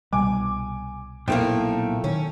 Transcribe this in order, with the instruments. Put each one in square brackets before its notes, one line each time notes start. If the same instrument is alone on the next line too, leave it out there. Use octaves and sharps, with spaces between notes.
[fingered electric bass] C2 B2 G3 [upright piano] G#5 D6
[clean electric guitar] B1 A#2 [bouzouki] F3 A3 A#3 [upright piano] E4 A4 G5
[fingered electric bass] D#3 [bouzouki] C#4